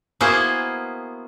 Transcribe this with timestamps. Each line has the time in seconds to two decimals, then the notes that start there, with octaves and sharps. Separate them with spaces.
0.21 A#3 B3 E4 F#4 G#4 C5